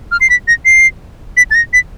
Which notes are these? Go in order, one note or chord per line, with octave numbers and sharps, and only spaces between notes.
F6
C7
B6
A#6
C7
B6
A6
A#6
B6